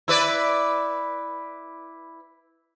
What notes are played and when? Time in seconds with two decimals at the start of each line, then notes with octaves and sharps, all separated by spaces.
0.08 E4 B4 D5